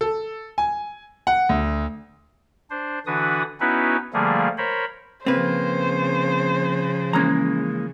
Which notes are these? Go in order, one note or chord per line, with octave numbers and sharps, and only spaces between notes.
A4
G#5
F#5
D2
D4 C5
D3 E3 D4 F#4 B4 D#6
B3 C#4 D#4 E4 F#4 B4
D3 F3 G3 A3 A#3 G#4
A#4 C5 C#5 B5
C#3 F3 A#3 C4 B4 C5
E3 G#3 A#3 C#4 A#5